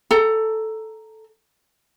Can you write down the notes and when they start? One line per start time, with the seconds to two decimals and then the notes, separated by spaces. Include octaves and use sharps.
0.11 A4 A#5